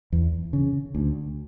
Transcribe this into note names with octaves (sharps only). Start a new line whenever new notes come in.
E2
C#3
D2